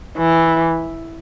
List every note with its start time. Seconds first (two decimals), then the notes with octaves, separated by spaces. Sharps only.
0.18 E3